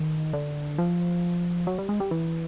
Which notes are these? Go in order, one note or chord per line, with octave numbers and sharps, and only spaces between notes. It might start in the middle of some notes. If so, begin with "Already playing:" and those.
Already playing: D#3
D3
F3
F#3
G3
G#3
G3
E3